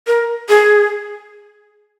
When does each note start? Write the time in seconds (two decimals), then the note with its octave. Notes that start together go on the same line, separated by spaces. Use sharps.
0.07 A#4
0.49 G#4